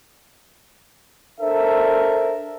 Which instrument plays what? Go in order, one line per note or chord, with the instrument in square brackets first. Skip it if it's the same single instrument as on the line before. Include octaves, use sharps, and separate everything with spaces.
[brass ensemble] D4 A4 A#4 C5 E5